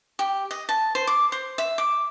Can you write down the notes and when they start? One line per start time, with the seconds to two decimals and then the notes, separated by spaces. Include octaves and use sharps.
0.19 G4
0.51 D#5
0.69 A5
0.95 C5
1.07 D6
1.32 C5
1.58 E5
1.78 D6